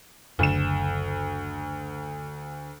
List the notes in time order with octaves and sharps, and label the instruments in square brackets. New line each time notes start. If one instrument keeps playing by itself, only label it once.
[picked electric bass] F#1 [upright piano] D2 E7